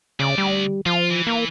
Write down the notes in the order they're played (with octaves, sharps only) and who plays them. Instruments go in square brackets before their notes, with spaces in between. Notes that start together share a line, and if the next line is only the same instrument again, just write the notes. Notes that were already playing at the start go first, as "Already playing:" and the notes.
[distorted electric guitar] D2 D5 [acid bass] C#3
[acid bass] G3
[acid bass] F3 [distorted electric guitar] F4
[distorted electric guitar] E3
[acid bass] A#3